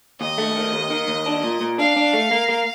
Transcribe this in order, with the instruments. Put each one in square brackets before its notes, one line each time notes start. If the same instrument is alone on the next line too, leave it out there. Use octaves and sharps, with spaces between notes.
[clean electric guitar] D#2 [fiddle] D#5
[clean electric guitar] A3
D#3
D#2
D#3
D#2
D4
A#2
A#2
[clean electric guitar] D4 [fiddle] F5
[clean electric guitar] D4
A3
A#3
A#3